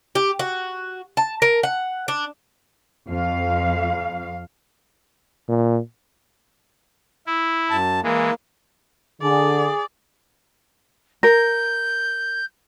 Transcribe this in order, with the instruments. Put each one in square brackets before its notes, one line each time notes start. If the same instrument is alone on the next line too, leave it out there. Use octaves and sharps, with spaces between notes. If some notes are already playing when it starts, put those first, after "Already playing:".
[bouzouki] G4
F#4
A5
A#4
F#5
D4
[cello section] F2 F5
[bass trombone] A#2
[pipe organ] E4
[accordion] F#2 A5
[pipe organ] E3 G#3 [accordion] A#3
[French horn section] D3 [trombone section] G#4 [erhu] D5
[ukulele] A#4 [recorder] G6